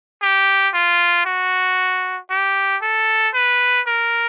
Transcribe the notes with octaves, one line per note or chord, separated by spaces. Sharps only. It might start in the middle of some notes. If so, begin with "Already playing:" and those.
G4
F4
F#4
G4
A4
B4
A#4